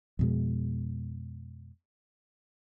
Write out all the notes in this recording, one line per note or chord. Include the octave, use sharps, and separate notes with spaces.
F2 B2 G#3